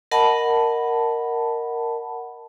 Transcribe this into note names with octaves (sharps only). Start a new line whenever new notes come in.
A#4 D#5 F#5 A5 B5